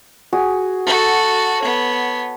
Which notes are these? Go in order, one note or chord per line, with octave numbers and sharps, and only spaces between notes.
F#4 G#4 G#5
F#4 A4 A5
B3 C#5